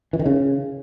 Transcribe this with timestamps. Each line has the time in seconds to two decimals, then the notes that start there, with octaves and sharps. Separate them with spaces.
0.13 E3
0.19 D#3
0.26 C#3